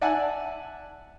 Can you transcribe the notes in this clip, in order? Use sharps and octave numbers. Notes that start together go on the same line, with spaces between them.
D5 E5 F#5 G#5 A5 E6